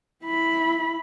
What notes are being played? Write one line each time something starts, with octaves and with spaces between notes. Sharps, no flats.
E4 B5